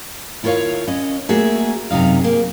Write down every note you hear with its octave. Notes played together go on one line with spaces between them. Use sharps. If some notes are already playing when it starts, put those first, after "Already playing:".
D#2 E4 F4 A#4 C#5 F5
C#4 D#5
A3 A#3 F#4 G#4 E5
F#2 C3 A3 D#4 F5
A#3 G#4